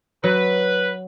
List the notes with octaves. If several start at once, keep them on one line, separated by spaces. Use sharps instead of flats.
F#3 B4